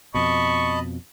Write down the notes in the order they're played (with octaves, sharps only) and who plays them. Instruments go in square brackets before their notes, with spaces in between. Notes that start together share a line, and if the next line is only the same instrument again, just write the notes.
[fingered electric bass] F2 B2 [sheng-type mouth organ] D#5 A5 B5 [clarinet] C#6